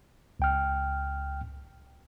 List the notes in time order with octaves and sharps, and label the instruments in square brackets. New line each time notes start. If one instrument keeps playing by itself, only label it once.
[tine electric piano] C#2 G5 F6